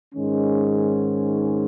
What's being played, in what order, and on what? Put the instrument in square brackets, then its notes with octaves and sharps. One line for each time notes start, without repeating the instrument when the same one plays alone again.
[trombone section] G#2 D#3 G#3 C#4